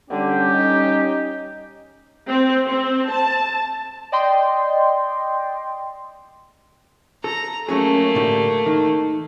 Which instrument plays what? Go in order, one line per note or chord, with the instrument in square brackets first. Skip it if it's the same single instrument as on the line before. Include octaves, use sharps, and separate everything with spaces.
[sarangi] D3 [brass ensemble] G3 C#4 G4
[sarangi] D#4
[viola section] C4
C4
A5
[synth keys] D5 D#5 G5 C6
[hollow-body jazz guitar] A4 [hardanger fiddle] A#5
[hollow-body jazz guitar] F#3 C#4 G#4 [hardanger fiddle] A3 A#3
[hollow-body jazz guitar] A2 D3 G4
D#3